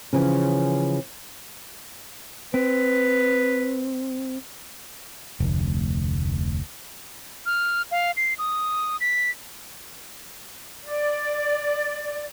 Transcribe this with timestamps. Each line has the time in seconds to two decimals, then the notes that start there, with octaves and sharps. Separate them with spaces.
0.13 C#3 E3 F3 B4 G#5
2.54 C4 B4
5.40 F1 D2
7.46 F6
7.91 F5
8.17 C7
8.38 D#6
9.01 B6
10.84 D5